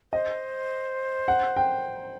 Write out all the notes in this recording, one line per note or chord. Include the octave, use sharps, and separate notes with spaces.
C5 D#5
F#5
G5